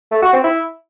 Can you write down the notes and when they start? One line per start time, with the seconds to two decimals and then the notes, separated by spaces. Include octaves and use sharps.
0.11 A3
0.22 F#4
0.33 C4
0.44 E4